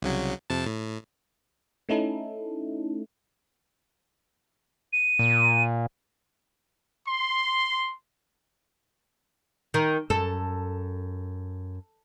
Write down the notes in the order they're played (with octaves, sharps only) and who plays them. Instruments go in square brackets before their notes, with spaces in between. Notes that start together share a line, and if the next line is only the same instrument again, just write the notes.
[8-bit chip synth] C2 C#3 F#3
F2 C3 A5
A2
[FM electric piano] A3 C#4 D#4 E4 A4
[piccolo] D#7
[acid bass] A#2
[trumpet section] C6
[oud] D#3
[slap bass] F#2 [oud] A4